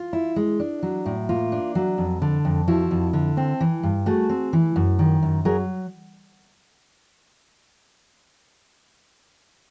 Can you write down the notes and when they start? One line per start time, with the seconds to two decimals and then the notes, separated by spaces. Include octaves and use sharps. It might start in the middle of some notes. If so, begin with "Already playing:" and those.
Already playing: F4
0.13 E4
0.36 G#3
0.60 D4
0.83 F#3
1.06 A2
1.29 A#3 F4
1.52 D4
1.75 F#3
1.98 F2
2.22 D3
2.45 F2
2.68 F3 E4 F#4
2.91 F2
3.13 D3
3.37 C4
3.60 E3
3.83 G2
4.06 A3 F#4 G#4
4.29 C4
4.53 E3
4.76 F#2
4.99 D#3
5.23 F#2
5.45 F#3 G#4 A#4